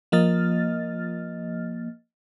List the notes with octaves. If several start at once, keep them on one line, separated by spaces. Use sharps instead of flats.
F3 A#3 D#5 F6 A6